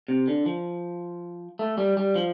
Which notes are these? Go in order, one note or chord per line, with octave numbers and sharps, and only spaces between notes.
C3
D3
F3
A3
G3
G3
F3